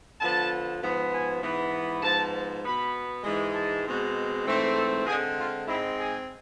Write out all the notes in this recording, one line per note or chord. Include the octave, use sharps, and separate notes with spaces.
D3 F3 B3 A5
G#2 F3 B3
G#5
G#2 E3 B3
G#2 F3 B3 A5
B2 B3 B5
G#2 E3 G#3
A5
B2 G#3 C4
G#2 E3 A3 C4
A4
D3 G#3 C4 G#4
F4
G#2 G#3 C4 E4
G#4